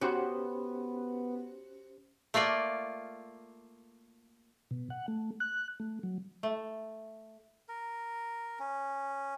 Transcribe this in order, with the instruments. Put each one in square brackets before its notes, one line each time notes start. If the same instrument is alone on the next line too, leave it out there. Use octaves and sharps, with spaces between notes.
[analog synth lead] B3 [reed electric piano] C#4 G4 C5 [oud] F#4
[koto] A3 A#3 F4 D5
[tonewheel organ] B2
F#5
A3
F#6
A3
F#3
[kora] A3
[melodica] A#4
C#4